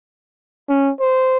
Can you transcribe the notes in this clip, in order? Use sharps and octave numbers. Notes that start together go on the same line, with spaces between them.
C#4
C5